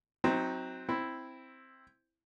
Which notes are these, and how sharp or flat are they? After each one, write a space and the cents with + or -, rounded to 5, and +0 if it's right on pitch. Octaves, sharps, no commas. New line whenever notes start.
F#3 +0 C4 +0 D#4 +35
C4 +0 E4 +0